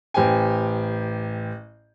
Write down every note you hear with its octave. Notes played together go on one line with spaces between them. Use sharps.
A1 G4 C5 G5 G#5